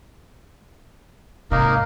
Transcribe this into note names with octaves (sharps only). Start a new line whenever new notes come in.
G#2 C3 A#3 D#4 A#4